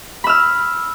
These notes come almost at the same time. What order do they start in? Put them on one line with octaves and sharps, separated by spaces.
B5 E6 F6